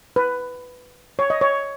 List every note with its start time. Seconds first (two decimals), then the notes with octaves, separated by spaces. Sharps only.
0.16 B4
1.19 C#5
1.30 D#5
1.41 C#5